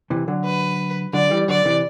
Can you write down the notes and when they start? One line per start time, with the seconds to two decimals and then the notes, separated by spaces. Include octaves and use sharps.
0.10 C3 E3
0.28 D3 F#3
0.44 B4
1.13 D3 F#3 D5
1.30 E3 G3
1.48 D3 F#3 D5
1.65 C3 E3